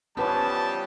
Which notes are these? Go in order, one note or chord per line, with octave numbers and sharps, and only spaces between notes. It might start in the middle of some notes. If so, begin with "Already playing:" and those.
E3 F3 G3 B3 C#4 B4 C#5 A5